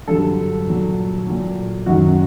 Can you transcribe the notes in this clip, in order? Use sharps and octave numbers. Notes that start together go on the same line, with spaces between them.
G2 D3 F#3 A4
A#2 F#3
A#2 F#3
F#2 D#3 F#3 F#4